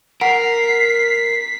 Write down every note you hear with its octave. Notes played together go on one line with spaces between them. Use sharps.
A#4 F#5 B6 C7